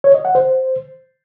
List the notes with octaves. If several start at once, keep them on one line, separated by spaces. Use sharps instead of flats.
C#5
D#5
F#5
C5